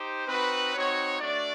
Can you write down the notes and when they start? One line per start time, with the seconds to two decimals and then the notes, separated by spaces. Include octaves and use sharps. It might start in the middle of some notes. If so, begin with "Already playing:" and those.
Already playing: D#4 G4 C5
0.28 C4 D#4 F#4 B4
0.75 C4 D#4 F#4 C#5
1.21 A3 D4 F#4 D5